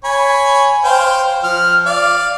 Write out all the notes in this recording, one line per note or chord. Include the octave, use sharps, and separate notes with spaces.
C#5 G#5 B5
C5 F5 G5
F3 F6
D5 F5